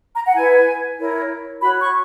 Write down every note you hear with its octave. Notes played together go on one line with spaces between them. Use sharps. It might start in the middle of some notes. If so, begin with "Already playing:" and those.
A#5
F#5
E4 B4 G#5
E4 A#4 C#5
F#4 C#5 B5
C#6